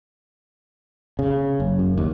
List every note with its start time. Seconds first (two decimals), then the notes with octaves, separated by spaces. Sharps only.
1.19 C#3
1.60 F#1
1.79 F#2
1.98 D#2